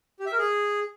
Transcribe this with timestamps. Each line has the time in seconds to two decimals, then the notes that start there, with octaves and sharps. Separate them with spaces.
0.20 G4
0.26 E5
0.32 A#4
0.39 G#4